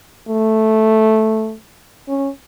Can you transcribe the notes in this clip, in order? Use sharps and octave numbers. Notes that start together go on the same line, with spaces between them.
A3
C#4